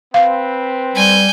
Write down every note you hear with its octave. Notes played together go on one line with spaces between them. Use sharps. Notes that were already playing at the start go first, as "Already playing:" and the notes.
C4 B4 F5
G3 G#5 G6